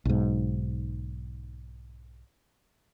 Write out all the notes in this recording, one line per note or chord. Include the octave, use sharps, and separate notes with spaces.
B1 G#2